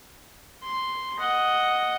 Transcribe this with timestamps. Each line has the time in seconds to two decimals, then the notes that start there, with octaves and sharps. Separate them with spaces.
0.63 C6
1.19 D#5 F#5